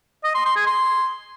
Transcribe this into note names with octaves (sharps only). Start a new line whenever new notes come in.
D#5
C6
C6
G#4
C6